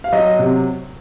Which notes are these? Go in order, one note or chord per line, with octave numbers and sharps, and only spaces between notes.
F5
F#3 D#5
C3